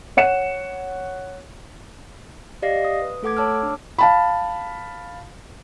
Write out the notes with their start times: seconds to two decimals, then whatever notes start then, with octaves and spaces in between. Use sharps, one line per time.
0.17 C#5 F#5 C#7 E7
2.62 G4 D5 D#5 F5 A#6 C7
2.85 D#6
3.02 B4
3.23 A3 A4 F#5 D6 G#6
3.37 C#5 A5 D6 E6 F6
3.63 D4
3.99 F5 A5 B5